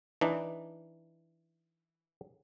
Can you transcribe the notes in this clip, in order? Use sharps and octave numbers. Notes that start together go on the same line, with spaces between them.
E3 D4 D#4